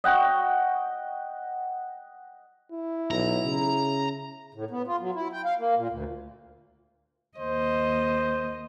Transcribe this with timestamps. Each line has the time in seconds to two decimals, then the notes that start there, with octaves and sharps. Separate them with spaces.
0.04 D#5 F#5 G5 C#6
2.72 E4
3.11 B1 A#5
3.45 C#3
4.54 A2
4.71 B3
4.87 F4
5.00 F#3
5.15 E4
5.33 G5
5.45 F5
5.58 A#3
5.77 A#2
5.90 D2
7.38 D#2 C5 D#5